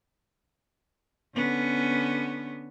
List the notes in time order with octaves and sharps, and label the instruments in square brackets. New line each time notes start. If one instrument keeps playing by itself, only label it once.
[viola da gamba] D3 B3 C#4